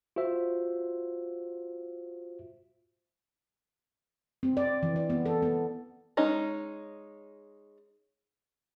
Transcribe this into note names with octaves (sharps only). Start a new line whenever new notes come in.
F4 F#4 C5 E5
C4
D5
E3
D5
B3
A4
B3
G#3 C#4 D#4